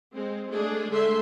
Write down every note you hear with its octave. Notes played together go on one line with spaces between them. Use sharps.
G#3 C4
G#3 A3 D4 G#4
D3 G#3 A3 E5 C6